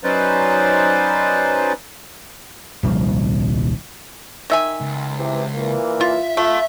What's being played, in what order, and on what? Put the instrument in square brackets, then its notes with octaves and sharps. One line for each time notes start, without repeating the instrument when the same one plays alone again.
[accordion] F#3 C#4 D#4 B4 C5 D5
[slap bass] D#1 C2 F3
[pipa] D#3 E5 G#5
[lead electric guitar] C#2
[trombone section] C3 E3
A#2 E3 A#3
[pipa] F4 [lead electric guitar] E5
[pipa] A3 [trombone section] F4